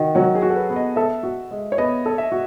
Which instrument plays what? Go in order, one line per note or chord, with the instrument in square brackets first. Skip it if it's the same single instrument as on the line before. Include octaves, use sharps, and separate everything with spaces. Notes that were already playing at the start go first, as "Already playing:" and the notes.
Already playing: [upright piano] D#3 [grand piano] F#4
[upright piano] F#3 [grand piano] F#4
[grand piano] G#4
[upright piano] F#4
[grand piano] A4
B4
[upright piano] B3
[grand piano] D#5
[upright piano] A4 [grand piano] E5
[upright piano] F#4
G#3
[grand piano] C#5
[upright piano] B3 [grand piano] D#5
[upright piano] A4
[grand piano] E5
[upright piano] F#4